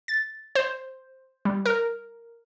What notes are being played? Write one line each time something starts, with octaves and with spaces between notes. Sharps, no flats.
A6
C5
G3
A#4